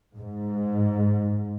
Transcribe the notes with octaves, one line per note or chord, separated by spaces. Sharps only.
G#2